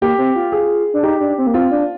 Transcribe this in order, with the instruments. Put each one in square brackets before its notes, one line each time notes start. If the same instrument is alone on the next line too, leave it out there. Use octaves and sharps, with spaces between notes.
[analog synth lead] A#3 [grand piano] G4
[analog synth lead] C4
F4
[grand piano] G#4
[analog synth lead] D4
[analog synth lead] D#4 [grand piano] G4
[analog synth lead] D4
C4
A#3
[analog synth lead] C4 [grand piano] F4
[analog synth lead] D4